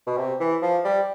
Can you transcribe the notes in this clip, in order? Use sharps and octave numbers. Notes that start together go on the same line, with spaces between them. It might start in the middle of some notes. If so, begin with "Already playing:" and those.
B2
C3
E3
F3
G3